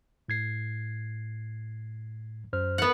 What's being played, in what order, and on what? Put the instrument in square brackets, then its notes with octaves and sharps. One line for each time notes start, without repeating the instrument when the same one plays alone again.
[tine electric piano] A2 G#6 C7
F#2 C5 F6
[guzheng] B3 F#5